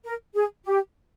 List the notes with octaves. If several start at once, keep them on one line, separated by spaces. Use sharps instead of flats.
A#4
G#4
G4